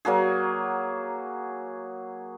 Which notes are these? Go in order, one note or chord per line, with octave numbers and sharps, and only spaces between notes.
F#3 A#3 F#4 G#4